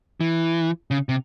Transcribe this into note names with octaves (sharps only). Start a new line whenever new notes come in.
E3
C#3
C3